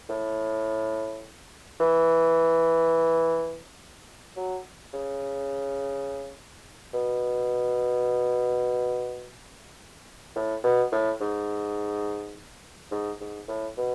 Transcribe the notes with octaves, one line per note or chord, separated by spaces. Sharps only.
A2
E3
F#3
C#3
B2
A2
B2
A2
G#2
G#2
G#2
A2
B2